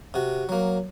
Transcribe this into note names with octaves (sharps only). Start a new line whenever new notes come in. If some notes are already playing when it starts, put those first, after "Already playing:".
C3 F#4
F#3 A#3